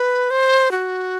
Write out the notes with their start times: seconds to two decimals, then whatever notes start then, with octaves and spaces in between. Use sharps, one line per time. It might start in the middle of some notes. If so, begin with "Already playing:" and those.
Already playing: B4
0.31 C5
0.71 F#4